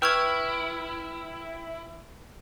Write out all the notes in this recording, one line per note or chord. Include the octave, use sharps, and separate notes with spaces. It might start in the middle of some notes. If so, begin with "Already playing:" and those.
E4 B4 G5 C#6 E6 F6 G#6